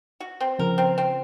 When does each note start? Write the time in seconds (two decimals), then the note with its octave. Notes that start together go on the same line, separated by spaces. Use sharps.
0.20 F#4
0.40 C4
0.59 C#3 F3 A#4
0.78 C4
0.98 C4